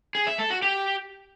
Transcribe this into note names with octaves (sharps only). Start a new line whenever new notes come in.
G#4
E5
A4
F#4
G4